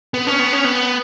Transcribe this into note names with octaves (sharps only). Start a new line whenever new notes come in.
B3
C#4
B3
C#4
B3